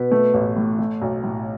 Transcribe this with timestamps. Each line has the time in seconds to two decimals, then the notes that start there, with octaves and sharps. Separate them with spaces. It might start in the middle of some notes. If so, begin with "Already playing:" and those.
Already playing: B2 B4
0.11 A3
0.34 A1
0.56 A2
0.79 A3
1.02 B1
1.24 A2